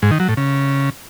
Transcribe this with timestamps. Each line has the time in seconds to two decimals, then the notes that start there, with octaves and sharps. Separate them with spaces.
0.02 G#2
0.11 D#3
0.20 F#3
0.28 A2
0.37 C#3